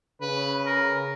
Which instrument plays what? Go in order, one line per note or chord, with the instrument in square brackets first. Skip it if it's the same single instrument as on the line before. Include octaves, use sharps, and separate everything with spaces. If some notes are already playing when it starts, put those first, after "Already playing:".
[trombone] C#3 [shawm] B4
[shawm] A#4